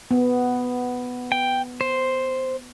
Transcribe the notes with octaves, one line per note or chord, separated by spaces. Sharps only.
B3
G5
C5